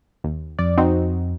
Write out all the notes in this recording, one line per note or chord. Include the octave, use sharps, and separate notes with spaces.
D#2
F2 D5
C4 D#4 F#4